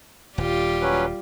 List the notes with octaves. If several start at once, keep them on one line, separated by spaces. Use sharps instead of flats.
D#1 G3 F4 G4
F#3 C#4 B4